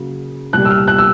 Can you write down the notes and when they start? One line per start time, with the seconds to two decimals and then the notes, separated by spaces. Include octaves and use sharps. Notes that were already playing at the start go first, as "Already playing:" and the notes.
Already playing: C#3 F#3 A#3
0.53 C2 A#2 G3 F#6
0.65 E6
0.70 F6
0.88 F#6
0.98 E6